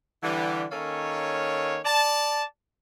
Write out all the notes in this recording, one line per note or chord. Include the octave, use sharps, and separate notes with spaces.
D3 E3 G3
D#3 A#3 C#4 A4 C#5
D5 A5